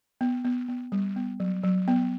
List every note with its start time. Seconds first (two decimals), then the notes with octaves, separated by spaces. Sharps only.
0.21 B3
0.45 B3
0.68 B3
0.92 G3
1.16 B3
1.40 F#3
1.63 F#3
1.88 B3